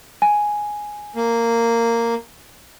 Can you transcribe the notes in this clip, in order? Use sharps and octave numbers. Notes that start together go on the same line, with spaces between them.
G#5
A#3